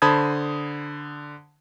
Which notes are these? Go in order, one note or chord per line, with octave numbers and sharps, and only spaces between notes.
D3 C5 A5 B5 D#6 G#6